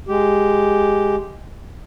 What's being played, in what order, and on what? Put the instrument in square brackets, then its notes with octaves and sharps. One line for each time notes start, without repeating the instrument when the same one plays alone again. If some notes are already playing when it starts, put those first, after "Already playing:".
[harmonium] G#3 G4